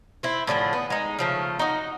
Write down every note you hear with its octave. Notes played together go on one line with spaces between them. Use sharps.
C4 E4
A2 D3 F3 G#4
B3
G#3 D#4
C#3 F3 A3
D#4 F#4 D#5